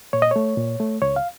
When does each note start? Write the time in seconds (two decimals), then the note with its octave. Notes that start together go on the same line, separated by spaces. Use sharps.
0.13 A#2 C#5
0.22 D#5
0.31 A3 C#5
0.57 A#2
0.80 A3
1.02 C#2 C#5
1.16 F5